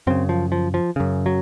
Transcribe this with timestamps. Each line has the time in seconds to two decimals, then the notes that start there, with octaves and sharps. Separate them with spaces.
0.07 F#2 C#3 C4
0.29 F3
0.52 F3
0.74 F3
0.96 F#2 C#3
1.26 F#3